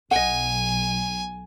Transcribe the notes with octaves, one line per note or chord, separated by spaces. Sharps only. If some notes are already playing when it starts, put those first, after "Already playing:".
B1 D#5 F#5 G#5